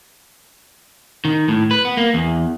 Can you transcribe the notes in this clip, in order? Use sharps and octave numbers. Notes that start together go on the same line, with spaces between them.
D#3
A2
B4
B3
A#3
E2